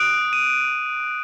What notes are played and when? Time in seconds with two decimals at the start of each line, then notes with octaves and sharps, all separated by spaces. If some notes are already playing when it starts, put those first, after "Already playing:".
Already playing: D#6 F#6 D7
0.33 D#7